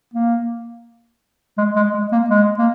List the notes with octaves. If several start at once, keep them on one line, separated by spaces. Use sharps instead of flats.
A#3
G#3
G#3
G#3
A#3
G#3
A#3